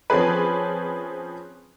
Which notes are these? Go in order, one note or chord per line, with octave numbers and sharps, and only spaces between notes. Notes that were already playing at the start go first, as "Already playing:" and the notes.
F3 C4 C#4 G#4 B4